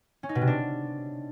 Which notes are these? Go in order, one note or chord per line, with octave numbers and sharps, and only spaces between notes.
C#4
D#4
B2
C3
D4